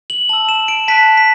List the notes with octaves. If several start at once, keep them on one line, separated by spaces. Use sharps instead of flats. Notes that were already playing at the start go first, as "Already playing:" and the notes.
F#7
A5 E6 F#7
E7
D7
A5 F#6 B6
B6